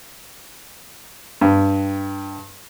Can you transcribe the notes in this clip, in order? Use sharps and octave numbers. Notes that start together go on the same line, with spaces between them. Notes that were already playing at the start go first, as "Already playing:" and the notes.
G2